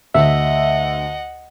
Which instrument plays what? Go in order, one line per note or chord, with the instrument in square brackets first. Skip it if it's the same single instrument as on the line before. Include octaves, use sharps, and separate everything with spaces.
[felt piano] D2 [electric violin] D#5 F#5 [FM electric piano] E5